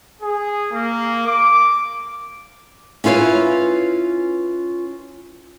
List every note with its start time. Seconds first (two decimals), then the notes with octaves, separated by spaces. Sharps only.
0.22 G#4
0.72 A#3
1.26 D6
3.04 C#4 E4 F4 B4 C#5